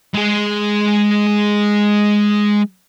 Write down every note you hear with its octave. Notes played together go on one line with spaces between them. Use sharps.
G#3 G#4